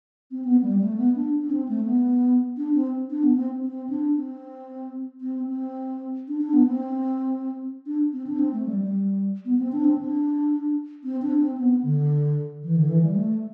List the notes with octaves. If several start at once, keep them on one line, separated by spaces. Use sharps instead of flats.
C4
B3
G3
A3
B3
D4
D4
C4
A3
B3
D4
C4
D4
B3
C4
C4
D4
C4
C4
C4
D4
D4
B3
C4
D4
C4
D4
C4
A3
G3
G3
B3
C4
D4
C4
D4
C4
D4
C4
B3
D3
E3
D3
E3
G3
A3